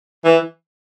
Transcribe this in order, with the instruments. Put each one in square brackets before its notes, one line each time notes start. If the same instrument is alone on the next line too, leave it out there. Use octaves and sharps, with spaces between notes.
[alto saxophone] E3